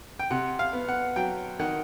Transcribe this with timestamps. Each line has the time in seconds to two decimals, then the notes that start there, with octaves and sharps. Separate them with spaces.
0.19 G5
0.31 C3 F#5
0.59 F5
0.73 B3
0.88 F#5
1.16 F#3 G5
1.60 D#3 F#5